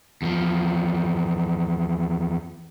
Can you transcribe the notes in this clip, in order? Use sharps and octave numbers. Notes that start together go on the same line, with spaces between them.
E2 F3